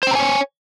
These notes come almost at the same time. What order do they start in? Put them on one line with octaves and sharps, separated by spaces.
C5 G5 A#5 G#5 C#5